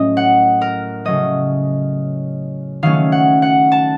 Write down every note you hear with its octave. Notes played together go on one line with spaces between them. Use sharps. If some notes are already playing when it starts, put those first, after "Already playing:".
Already playing: A2 F#3 A3 C#4 D#5
F#5
A#4
C#3 F#3 A3 D#5
D#3 F#3 A3 C#4 F5
F#5
F#5
A5